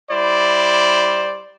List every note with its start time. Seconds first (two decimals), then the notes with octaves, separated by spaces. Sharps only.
0.11 G3 E4 C5 D5